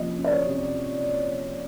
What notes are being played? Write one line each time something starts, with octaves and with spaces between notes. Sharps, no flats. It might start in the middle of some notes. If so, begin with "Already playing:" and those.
Already playing: C3 F3 A#3 C#4 D#5
C#4
D5
C#5
C3